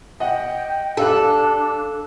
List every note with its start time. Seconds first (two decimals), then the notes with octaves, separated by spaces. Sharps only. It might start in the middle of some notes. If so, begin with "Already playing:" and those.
0.20 D#5 F#5 G5
0.97 D4 G4 A4 F5 F#6